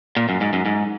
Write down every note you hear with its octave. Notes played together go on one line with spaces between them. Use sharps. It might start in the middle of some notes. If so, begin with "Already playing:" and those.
A#2
F#2
G#2
F#2
G#2